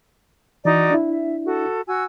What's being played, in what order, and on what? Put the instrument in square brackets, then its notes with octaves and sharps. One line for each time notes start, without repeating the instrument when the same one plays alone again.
[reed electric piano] E3 [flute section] D#4 F#4 D5
[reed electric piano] D4 E4
[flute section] E5
F#4 A4
F#4 G#5 E6